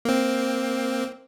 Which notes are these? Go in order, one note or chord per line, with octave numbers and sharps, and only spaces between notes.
A#3 C4